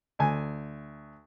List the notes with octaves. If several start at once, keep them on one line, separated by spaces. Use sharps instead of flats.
D2 G#5